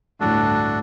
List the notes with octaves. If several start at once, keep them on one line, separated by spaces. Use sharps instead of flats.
G1 D2 A2 D4 F#4 A4